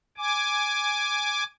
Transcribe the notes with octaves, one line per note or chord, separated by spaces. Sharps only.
G#5 D6